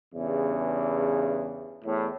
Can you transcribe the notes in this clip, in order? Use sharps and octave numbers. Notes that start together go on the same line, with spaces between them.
E2 G2 C#3
E2 A2